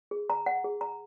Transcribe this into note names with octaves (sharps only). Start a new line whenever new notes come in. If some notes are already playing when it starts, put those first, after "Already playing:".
G#4
A#5
F#5
G#4
A#5